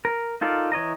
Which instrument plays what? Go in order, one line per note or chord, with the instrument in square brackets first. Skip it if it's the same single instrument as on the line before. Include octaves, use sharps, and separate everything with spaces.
[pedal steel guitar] A#4
D#4 F4 A4 A#4 D5
E3 C#5 D#5 A#5